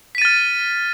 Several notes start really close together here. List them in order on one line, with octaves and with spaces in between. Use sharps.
B6 D#7 A6 F6